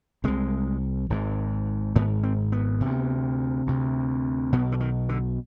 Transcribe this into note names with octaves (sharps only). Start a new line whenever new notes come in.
C2 C3 G#3
G#1 G#2
G#1 G#2 B3
C4
B3
D2 C3
D2 C3
B1 B2 B3
D3
D#3
D3